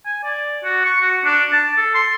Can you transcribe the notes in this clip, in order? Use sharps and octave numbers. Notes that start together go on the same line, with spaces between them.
G#5
D5
F#4
C#6
F#4
D4
A5
A4
C6